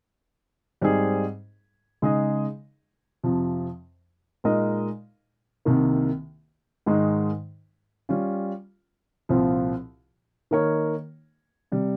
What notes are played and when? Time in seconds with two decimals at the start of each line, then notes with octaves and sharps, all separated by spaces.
0.81 G#2 G3 C4 D#4 G#4
2.02 C#3 G#3 D#4 G#4 D#5
3.24 F2 C3 F3
4.44 A#2 G#3 D#4 A#4 D#5
5.65 C2 C3 D#3 A#3
6.86 G#2 D#3 G#3 D#4
8.09 G3 C#4 F4
9.29 C2 A#2 F3 C4 F4
10.51 D#3 A#3 D#4 A#4 C#5
11.72 C3 G3